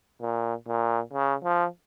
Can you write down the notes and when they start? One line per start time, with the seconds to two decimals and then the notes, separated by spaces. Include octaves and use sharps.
0.22 A#2
0.68 A#2
1.13 C#3
1.44 F3